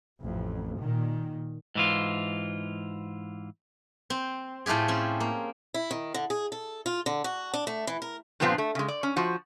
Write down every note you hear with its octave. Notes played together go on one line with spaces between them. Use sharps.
A1 F2
A#2 D#3
G#2 E3 F4
C4
A2 A3 F4 G4 G#4
C4 C#4
A#3
E4
D#3
D3
G#4
A4
F4
D3
F#4
D4
A3
E3
A#4
G2 A#2 F3 B3 C4 F4
A3
C#3 G#3
D5
C#4
F3 F#4